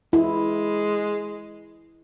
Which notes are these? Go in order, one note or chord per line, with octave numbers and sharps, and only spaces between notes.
G#3 E4